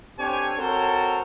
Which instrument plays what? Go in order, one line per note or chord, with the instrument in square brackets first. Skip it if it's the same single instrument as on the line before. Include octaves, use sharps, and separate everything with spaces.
[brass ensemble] C4 D4 G4 A4 C#5 G#5
C4 F#4 A4 A#4 C5 C#5